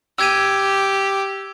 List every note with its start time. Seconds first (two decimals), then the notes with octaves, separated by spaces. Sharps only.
0.19 G4 E6 G#6 D#7